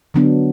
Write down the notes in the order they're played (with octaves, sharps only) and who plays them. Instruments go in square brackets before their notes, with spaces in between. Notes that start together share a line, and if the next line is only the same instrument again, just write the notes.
[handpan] D3 F#3 B3 D4